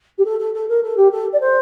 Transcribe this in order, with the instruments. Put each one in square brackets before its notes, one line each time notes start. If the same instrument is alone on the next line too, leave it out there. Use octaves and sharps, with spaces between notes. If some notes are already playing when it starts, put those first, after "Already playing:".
[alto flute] G4
A4
A4
A4
A#4
A4
G4
A4
D5
C5